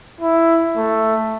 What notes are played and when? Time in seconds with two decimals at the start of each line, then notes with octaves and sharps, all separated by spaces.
0.21 E4
0.77 A3